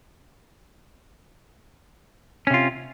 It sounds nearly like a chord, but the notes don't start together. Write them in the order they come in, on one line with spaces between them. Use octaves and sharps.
C#4 C3 F4